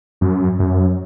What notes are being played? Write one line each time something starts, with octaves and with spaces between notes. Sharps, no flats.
F#2
F#2